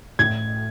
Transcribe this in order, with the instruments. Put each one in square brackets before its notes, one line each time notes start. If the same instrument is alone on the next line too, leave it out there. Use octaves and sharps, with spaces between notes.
[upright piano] A2 G#6